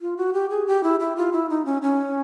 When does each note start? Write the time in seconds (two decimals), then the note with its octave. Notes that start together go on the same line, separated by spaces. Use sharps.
0.01 F4
0.17 F#4
0.33 G4
0.50 G#4
0.67 G4
0.83 E4
1.00 E4
1.16 F4
1.32 E4
1.49 D#4
1.65 C#4
1.82 C#4